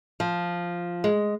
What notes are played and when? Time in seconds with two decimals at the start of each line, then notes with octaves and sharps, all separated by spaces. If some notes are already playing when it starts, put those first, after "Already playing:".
0.20 F3
1.04 G#3